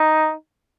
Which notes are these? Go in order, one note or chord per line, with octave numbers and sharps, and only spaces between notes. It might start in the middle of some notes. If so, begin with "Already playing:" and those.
Already playing: D#4